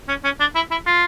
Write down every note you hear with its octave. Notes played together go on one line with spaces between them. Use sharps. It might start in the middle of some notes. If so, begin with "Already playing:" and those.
C#4
C#4
D4
E4
E4
F4